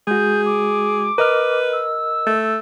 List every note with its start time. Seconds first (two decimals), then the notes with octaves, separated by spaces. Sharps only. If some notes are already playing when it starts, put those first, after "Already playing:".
0.07 G#3 F#4 G#4 G6
0.46 D6
1.18 A#4 B4 D#5 F6
1.72 E6
2.27 A3